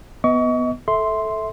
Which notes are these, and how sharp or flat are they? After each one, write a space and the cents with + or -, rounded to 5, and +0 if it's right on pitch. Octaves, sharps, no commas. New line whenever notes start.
B3 +0 D#5 +25 C#6 +30
A4 -5 E5 -15 C6 +0